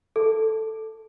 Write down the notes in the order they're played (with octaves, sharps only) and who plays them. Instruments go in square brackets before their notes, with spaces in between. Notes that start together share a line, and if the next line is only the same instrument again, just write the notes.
[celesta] A4